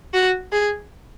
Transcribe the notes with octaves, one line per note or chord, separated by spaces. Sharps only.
F#4
G#4